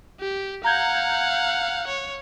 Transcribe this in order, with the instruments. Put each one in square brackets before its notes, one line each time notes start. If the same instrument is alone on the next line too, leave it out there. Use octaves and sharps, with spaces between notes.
[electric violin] G4
[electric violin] F5 F#5 [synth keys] A#5 G6 G#6
[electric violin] C#5